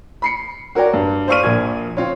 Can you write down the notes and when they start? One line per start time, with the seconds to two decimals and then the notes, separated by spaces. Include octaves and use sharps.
0.22 B5 C7 C#7
0.75 F#4 A#4 C#5 D5 G5
0.93 G2
1.28 C5 D5 F5 C#6 F6 D#7
1.43 A#1 A#2 F3 G#6
1.97 C4 F4 C#5